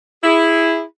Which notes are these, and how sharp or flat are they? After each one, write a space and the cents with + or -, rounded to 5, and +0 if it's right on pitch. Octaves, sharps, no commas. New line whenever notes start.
E4 +0 G#4 -15